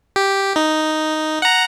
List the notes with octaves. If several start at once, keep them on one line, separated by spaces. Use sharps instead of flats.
G4
D#4
F#5 A#5